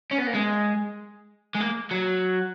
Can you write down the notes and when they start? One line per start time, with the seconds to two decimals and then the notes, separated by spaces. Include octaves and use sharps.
0.11 C#4
0.18 B3
0.27 A#3
0.34 G#3
1.55 G#3
1.60 A#3
1.91 F#3